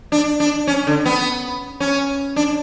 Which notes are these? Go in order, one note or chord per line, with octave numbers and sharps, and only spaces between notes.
D4
D4
C#4
D3
B3
C#4
D4